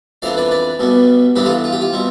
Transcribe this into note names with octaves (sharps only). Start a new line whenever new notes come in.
F2 E3 B3 D4 D5 F5
B4 D5
B4 D5
B1 B2 G3 B3
G2 E3 B3 D4 G4 B4
F4 A4
F4
G4
F4
B2 G3 C4